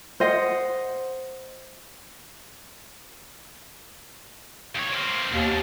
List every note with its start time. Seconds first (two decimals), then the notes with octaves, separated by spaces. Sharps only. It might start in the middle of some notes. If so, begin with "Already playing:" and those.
0.20 C5 D#5 F#5
4.75 D#2 C#5
4.93 A#3 C4
5.32 D#2 B2 D4